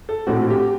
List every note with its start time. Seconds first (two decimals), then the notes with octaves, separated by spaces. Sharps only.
0.09 A4
0.26 A#1 A2 A3 C4 F#4
0.50 G4